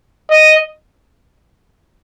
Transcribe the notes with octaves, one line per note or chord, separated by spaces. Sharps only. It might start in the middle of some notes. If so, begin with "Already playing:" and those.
D#5